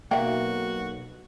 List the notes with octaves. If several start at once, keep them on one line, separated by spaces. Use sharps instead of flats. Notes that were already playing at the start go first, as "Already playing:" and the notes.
B1 A#3 F#4 E5 G5